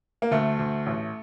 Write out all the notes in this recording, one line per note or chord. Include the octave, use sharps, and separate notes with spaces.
A#3
D2 A3
D2
A1